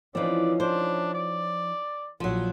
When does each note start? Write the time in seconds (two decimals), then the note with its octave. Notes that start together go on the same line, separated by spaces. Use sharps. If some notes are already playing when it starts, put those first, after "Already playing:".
0.15 E3 F3 C4 C#4 D#4 F4 D5
0.60 D4 C5
1.14 D5
2.20 A#1 F3 F#3